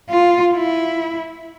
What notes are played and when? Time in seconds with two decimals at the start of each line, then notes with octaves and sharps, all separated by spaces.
0.09 F4
0.55 E4